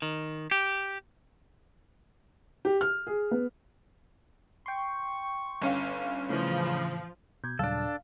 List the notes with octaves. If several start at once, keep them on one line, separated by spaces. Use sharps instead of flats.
D#3
G4
G4
F6
G#4
B3
G5 C6 C#6
G1 C#4 F5
A2 C#3 E3 F3
B2 G6 G#6
D#2 A#2 C#3 F#3 G3 D4 A4 F5